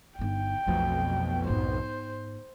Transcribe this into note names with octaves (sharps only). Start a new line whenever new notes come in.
G1 D#4 G5
B1 F2 B2 F3 A3
G#2 B3 C5